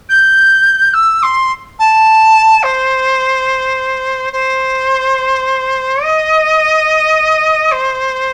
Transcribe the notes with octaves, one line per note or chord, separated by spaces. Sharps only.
G6
E6
C6
A5
C5
C5
D#5
C5